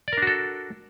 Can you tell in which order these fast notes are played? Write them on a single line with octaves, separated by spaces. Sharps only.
D5 A#4 D4 F#4 A4